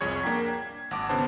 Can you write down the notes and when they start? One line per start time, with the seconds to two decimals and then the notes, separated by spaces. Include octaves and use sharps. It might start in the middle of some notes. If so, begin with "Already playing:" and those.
0.01 C2 F2 G#4 C#5 C#6 G#6
0.23 A#3 D4 G5 A#5 B6
0.54 G#6
0.91 G#1 F#5 A5 D6
1.09 C#3 B3 D4 C5 A5